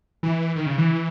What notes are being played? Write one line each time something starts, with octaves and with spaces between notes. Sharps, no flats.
E3
D#3
C#3
E3